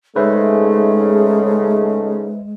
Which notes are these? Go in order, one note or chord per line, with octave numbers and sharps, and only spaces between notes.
G#2 C#3 G#3 A3 B4 C5 E5